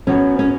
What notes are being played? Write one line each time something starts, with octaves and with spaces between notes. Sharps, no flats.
F#2 F#3 B3 C#4 F#4 C#5
C#4